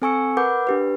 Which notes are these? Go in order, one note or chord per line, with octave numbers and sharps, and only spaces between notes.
C4 A4 G#5 C#6 E6 C#7
A#4 B4 F#5 B5 D6 G6
D4 G4 B4